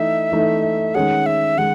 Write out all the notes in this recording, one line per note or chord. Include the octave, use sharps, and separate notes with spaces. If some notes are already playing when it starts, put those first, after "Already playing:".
Already playing: E3 A3 D#4 E5
E3 A3 D#4
D#3 G#3 C#4 G#4 F#5
E5
D#3 G#3 F#5